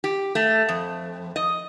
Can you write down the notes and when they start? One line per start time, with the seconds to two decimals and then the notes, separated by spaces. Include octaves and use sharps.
0.04 G4
0.35 A3
0.69 F2
1.36 D#5